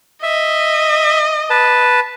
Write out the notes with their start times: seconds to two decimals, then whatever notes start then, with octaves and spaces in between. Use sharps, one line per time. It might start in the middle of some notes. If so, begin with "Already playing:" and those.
0.23 D#5 E5
1.50 B4 A5